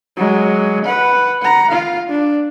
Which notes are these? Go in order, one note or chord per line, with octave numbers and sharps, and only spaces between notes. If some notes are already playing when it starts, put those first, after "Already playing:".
F#3 G#3
B4 F#5
F#5 A#5
F4 F5
D4